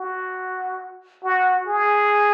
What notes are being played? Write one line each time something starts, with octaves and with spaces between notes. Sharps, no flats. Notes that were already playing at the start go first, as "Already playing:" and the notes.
Already playing: F#4
F#4
G#4